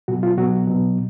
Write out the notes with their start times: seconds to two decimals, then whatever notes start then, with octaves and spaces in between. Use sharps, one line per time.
0.08 B2 F#3 F#4
0.23 F4
0.38 B2 F#3 F#4
0.67 B2 F#3